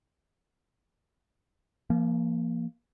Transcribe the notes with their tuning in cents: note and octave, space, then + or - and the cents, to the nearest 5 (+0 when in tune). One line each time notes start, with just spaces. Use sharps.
F3 -35 A#3 +0